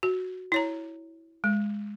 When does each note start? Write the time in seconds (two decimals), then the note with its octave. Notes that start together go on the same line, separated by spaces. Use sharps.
0.03 F#4
0.52 E4 C#5 A#5
1.44 G#3